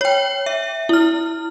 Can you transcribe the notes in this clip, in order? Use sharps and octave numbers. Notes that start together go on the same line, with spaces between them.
C#5 G5
E5
E4 F6